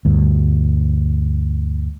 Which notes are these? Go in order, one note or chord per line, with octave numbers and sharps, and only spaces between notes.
D2 G2